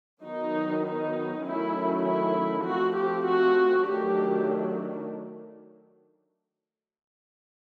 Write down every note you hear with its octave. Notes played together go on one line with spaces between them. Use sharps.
D#3 F#3 B3 D#4
D#4
D#3 F#3 A3 C#4 E4
E4
F3 A3 C4 F#4
G4
F#4
D#3 F#3 A3 D4 G4